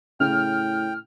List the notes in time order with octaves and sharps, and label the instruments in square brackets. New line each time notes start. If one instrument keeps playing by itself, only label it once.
[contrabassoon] A2 [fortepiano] C#3 [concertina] G5 [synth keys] F6